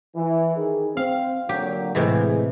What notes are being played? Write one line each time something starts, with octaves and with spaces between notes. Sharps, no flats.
E3
D#3 D#4 G#4
C4 F5
A#2 D3 F#3 G4
A2 C3 E3 G#3